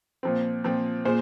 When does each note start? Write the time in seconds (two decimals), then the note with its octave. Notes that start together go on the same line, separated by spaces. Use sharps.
0.23 A#2 F3 C4
0.64 A#2 F3 C4
1.05 A#2 G#4 C5